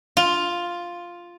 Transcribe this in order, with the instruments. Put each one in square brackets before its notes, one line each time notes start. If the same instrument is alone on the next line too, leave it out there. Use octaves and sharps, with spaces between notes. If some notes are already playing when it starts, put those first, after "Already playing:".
[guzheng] F4